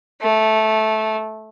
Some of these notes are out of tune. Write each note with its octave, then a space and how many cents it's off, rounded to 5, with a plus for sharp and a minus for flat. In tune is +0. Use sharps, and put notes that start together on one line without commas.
A3 -10